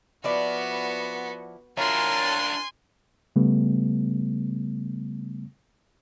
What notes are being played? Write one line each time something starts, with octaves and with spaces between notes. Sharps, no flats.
F3 B3 E4 F#4 D5
F#3 D4 E4 F4 A#4 G#5 C6
C#3 G3 A3 B3